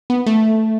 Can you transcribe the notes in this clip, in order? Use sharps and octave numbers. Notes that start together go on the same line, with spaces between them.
B3
A3